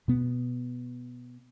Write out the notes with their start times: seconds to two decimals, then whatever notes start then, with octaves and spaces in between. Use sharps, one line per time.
0.08 B2 B3